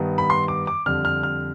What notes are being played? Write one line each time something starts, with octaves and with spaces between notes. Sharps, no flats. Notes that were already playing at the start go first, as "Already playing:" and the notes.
Already playing: G2 D#3 B3
B5
C6
D6
D6
F2 D3 G3 F6
F6
F6